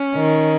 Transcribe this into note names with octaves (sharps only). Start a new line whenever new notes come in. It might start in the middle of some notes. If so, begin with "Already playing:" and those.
Already playing: C#4
D#3